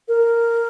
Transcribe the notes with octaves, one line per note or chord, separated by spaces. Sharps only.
A#4